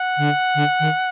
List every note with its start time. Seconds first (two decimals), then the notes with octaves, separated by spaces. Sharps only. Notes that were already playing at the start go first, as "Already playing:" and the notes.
Already playing: F#5
0.17 D3
0.55 D3
0.80 D#3